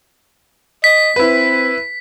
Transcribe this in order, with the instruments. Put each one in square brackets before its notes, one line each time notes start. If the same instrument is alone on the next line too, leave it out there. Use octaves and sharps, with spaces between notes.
[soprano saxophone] D#5 [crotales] B6
[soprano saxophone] C4 [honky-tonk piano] E4 B4